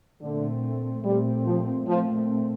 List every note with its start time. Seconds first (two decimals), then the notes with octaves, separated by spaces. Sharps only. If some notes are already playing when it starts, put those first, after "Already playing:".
0.22 A#2 D3 A3 C4
1.05 A#2 G3 A3 C4
1.45 F3
1.87 A#2 F3 A3 C4